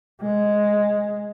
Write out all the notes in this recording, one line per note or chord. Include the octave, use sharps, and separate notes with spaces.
G#3